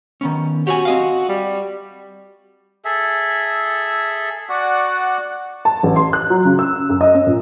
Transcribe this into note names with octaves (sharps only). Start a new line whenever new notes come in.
D#3 B3 C#4
F#4 G4 C#5 G#5
C4 D#5 F5
G3
G#4 A4 E5
F#4 D5 F#5
A5
A1
C6
F#6
F#3
C#3
E6
F#2
D#5
C#4
A#2